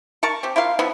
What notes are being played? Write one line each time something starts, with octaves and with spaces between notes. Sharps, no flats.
A#4 A5 C#6
C4 G4
E4 F4 A#4 F5
F3 B3 E4